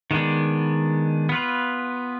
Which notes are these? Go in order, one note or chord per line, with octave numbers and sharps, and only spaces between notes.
D#3 G#3 B3 D4
B3 F4 B4